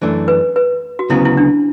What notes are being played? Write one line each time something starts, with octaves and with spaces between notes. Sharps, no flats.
F#2 E3 A3 D4
B4
B4
F#4
D2 C#3 F#3 B3 E4
E4
D4